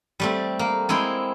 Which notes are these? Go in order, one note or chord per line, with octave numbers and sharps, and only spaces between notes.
G3 A3 C4
A#3
G#3 C4 E4 G5